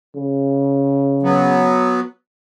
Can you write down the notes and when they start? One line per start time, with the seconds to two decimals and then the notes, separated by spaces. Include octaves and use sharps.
0.15 C#3
1.23 F#3 B3